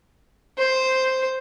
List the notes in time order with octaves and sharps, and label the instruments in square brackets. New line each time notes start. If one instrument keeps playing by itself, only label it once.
[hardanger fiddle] C5